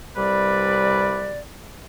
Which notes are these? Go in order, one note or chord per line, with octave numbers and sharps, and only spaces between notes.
C2 C3 G3 B4 D5